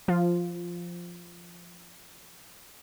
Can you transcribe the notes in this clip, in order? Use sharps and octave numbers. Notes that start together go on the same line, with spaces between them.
F3 F4